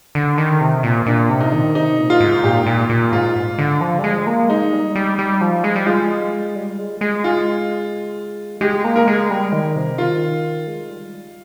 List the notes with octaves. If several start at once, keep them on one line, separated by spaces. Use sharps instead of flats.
D3
D#3
C3
A#2
A#2 D4
C3
D#4
D#3
C3 D#4
A#2
F4
G#2
A#2 G4
A#2
A#2
G#2 F4
D3
F3
G3
G#3
A#3
G#3 D#4
G3
G3
G3
F3
G#3
G3
G#3 F4
G3
G#3
G#3
F4
G#3 G4
A#3
A#4
G#3
G3
D#3
C3
D#3 F4
G#3
G3